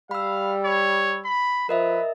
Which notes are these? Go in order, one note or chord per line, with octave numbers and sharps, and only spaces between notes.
G3 F5 B5 E6
C#5
B5
F3 A#4 B4 D#5 E5